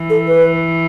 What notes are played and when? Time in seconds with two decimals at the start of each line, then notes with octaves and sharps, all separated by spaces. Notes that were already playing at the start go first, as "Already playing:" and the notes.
Already playing: E3
0.10 A4
0.28 B4